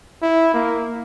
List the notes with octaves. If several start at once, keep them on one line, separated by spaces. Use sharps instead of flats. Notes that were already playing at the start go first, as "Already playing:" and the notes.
E4
A#3